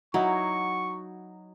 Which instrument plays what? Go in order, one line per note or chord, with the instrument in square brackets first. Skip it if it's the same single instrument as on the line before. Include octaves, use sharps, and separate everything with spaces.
[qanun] F#3 [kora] D#4 E4 F#4 [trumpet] C#6